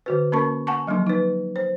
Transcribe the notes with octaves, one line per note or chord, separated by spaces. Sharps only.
D3 F#4 B4
A#3 C#4 A#4 A5 C#6
F#5 G#5 A5 C#6
F3 F#3 A#3 D4
D#4 B4
C5